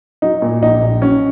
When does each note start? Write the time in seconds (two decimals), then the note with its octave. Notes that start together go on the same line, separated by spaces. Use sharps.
0.22 F#3 D#4
0.42 A#2
0.62 A#1 D#4
0.83 A#1
1.02 F#3 C#4